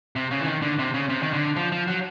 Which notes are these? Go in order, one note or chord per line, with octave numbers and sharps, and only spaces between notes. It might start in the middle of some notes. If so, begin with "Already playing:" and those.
C3
C#3
E3
D#3
D3
C3
C#3
C3
D#3
D3
F3
F3
F#3